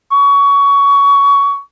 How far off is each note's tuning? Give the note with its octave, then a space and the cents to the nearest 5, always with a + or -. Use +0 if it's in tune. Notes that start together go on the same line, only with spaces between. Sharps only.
C#6 +20